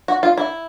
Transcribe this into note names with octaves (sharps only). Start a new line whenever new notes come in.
F#4
F4
E4